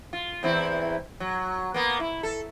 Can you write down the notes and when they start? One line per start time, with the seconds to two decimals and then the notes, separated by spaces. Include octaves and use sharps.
0.13 F4
0.43 E2 C4 E4
1.20 F#3
1.74 A#3 B3
2.00 E4
2.23 A4